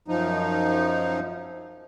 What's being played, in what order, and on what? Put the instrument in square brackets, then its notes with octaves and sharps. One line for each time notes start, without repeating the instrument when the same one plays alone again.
[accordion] F#2 F3 D#4